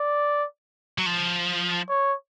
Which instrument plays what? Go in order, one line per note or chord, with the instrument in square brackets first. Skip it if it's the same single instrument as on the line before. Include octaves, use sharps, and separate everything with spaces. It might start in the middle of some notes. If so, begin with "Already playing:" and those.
Already playing: [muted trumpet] D5
[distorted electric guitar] F#3
F3
[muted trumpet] C#5